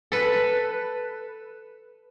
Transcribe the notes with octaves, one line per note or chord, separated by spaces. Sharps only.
A4 B4